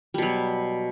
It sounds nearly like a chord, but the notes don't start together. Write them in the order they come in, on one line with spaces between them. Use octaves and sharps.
G3 B2 F#3